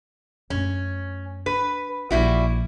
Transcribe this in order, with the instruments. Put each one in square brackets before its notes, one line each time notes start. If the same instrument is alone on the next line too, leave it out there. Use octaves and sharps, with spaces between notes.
[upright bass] F#2 A3 [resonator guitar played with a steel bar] C#4
[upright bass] D4 [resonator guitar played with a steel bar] B4
[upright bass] A#1 F3 [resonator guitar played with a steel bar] G3 E4 F#4